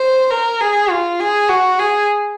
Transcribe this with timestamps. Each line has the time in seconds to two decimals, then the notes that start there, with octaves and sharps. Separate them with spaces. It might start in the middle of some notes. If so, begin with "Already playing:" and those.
Already playing: C5
0.30 A#4
0.60 G#4
0.91 F4
1.20 G#4
1.49 F#4
1.79 G#4